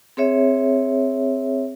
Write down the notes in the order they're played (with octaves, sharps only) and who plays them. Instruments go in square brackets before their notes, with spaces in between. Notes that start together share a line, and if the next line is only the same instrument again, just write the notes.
[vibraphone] C4 G#4 C#5 E5